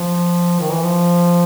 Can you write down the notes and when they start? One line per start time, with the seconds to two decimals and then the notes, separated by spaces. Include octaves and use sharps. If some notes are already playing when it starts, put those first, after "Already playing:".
Already playing: F3
0.60 D#3
0.71 E3
0.83 F3